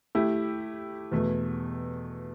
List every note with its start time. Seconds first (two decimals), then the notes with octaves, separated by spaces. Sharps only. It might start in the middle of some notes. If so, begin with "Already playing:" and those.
0.15 A3 E4 G4
1.11 E2 B2 A3